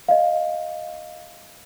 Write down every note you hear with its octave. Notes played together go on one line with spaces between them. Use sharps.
D#5 F5